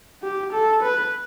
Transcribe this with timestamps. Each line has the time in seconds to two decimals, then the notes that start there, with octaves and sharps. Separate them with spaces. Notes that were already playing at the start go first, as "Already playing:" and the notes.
0.23 G4
0.53 A4
0.82 B4